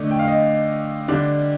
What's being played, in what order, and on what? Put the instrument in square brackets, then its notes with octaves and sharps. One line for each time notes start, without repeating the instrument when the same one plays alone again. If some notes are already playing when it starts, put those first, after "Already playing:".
Already playing: [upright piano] D3 A3 D#4 D5
G5
F5
D#5
D3 G3 D4 D5